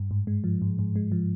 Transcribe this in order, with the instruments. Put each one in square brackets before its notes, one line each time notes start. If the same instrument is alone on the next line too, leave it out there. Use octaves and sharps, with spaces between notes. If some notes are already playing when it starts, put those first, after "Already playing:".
Already playing: [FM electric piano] G2
G#2
G#3
F3
G#2
G#2
G#3
F3